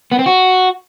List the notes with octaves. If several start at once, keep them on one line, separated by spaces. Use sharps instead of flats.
B3
C4
F#4